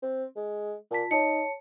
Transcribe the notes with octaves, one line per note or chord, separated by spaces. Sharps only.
C4
G#3
A#2 F4 A5 B6
D#4 C#5 A5 C#7